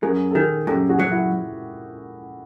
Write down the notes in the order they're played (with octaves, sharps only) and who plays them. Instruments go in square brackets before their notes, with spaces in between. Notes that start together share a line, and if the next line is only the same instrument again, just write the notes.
[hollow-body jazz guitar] F#2 [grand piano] G#4 A#4
[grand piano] A4
[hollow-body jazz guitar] D#3 [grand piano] G#4 A#4
[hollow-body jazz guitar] F#2 [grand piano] G4 A4
[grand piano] F#4 G#4
[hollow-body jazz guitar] F#3
[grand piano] E4 F#4